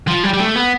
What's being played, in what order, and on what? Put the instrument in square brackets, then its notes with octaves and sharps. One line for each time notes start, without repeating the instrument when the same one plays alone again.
[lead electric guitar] F3
G3
G3
A3
B3